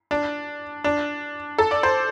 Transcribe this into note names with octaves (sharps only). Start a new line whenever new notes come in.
D4
D4
A4
D5
C5